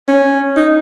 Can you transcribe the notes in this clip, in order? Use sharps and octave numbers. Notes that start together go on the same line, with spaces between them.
C#4
D#4